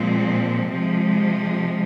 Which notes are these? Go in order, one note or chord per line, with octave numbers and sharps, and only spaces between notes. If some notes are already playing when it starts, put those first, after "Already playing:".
Already playing: A#2 F3 G#3 C4
C3 F3 G#3